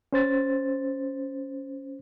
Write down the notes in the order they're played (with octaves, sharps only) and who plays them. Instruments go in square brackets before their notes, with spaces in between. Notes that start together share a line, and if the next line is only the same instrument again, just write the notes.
[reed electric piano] C#4 C5 A6